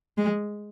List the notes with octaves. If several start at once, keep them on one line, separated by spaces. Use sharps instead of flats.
G#3